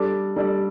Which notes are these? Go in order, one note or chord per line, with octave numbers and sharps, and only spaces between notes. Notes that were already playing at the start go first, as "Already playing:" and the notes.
Already playing: G3 D4 A4 D5
G3 D4 A4 D5